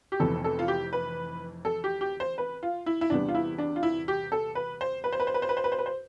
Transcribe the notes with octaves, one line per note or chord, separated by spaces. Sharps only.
G4
F1 F2 E3 B3 A4
A4
F4
G4
B4
A4
G4
G4
C5
B4
F4
E4
E4
E2 C3 G3 B3 D4
F4
E4
D4
F4
E4
G4
A4
B4
C5
B4
C5
B4
C5
B4
C5
B4
C5
B4
C5
B4
C5